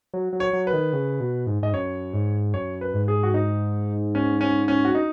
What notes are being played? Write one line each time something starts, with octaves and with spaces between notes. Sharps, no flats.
F#3
F#3
C#5
F#3
B4
D#3
C#3
B2
G#2
G#2 D#5
F#2 C#5
G#2
F#2 C#5
B4
G#2
G#4
F#4
D#4
C#4
C#4
C#4
F#4
D#4